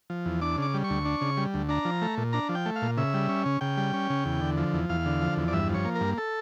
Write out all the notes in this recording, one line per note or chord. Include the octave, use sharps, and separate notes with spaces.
F3
E2
D4 D6
C#3 D6
G3
C#6
D2
D4
C#3
G3
D2
D4 A#5
F3
A3
A#2
D4 A#5
F3
G5
A3
F5
A#2
C#3 E5
G3
C#4
C#3
C#3 G5
G3
C#4
C#3
E2
D3
F3
E2
E2 F5
D3
F3
E2
D5
G2 E5
F3
C#5
A#3
A#4
G2
A4